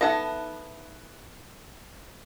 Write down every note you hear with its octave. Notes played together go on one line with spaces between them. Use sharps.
B3 D#4 A4 E5 F#5